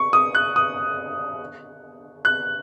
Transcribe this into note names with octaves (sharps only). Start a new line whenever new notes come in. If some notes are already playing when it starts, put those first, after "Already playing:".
Already playing: C#6
D#6
F#6
D#6
F#6